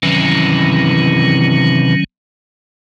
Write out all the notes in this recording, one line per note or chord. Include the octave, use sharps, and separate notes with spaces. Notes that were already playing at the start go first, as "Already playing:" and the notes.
C3 D#3 E3 F#3 C#4